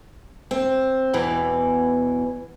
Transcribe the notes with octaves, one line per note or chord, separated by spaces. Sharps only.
C4
E2 B2 E3